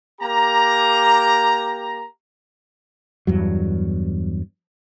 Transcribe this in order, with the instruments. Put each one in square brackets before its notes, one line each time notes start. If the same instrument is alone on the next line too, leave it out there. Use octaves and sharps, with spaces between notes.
[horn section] A#3 G4 A#5
[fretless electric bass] E2 G2 F#3